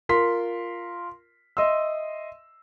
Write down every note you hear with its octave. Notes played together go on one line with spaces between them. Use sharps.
F4 A#4 C6 B6
D#5 E5 C6 E6